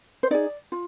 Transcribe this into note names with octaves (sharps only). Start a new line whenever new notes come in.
C5
D#4 G#4 D5
F4